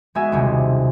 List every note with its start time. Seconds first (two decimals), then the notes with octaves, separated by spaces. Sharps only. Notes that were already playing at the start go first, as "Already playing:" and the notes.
0.15 G#3 B3 F#4 G#4 E5 G#5
0.32 D#1 B1 C3 G3 G#4